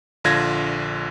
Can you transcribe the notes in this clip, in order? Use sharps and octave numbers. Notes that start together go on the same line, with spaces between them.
A#1 D3 F4 G#6 A#6